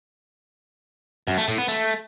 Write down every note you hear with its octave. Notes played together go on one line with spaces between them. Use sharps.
F#2
A3
A2
B3
A3